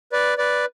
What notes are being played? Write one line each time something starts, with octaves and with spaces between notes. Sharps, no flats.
B4 D5
B4 D5